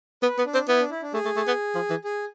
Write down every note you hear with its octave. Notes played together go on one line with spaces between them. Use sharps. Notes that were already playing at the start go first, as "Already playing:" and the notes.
B3 B4
B3
D4
C4
B3 E4
D4
E4
D4
A3 G#4
A3
A3
B3
F3
E3
G#4